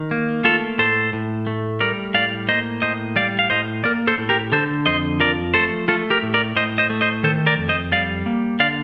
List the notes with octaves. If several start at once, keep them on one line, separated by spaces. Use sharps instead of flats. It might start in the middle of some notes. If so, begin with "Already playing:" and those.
Already playing: D#3
A#3
A3 F4 A4
A2 A4 C5
A2
A3
G3 A#4 D5
A2 D5 F5
A#3 C5 D#5
A2 C5 D#5
G3 D5 F5
F5
A2 C5 D#5
A#3 A#4 D5
A4 C5
A2
G4 A#4
D3 A4 C5
F2 C5 D#5
F3 A#4 D5
A3 A4 C5
A3 F4 A4
G4 A#4
A2
A#4 D5
A2 C5 D#5
C5 D#5
A3
C5 D#5
D#3 A4 C5
A#4 D5
F2
C5 D#5
G3 D5 F5
A#3
D3 D5 F5